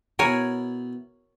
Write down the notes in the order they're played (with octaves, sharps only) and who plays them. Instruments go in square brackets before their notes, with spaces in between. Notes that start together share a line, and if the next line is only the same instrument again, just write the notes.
[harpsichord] B2 E4 [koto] A#4 C#5 G#5